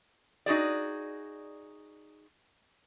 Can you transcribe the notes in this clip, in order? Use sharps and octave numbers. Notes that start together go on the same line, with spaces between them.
D#4 F#4 G#4 D5